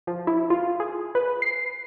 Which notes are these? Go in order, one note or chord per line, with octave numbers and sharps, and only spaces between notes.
F3
E4
F4
G#4
B4
C7